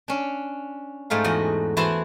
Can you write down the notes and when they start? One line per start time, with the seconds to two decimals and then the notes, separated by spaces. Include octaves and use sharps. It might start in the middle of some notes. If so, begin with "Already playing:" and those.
0.08 C#4 D4
1.10 G#2 A3 D#4 F5
1.24 E2 F#4 D#5
1.77 E3 E4 F#4 C5 A5 C6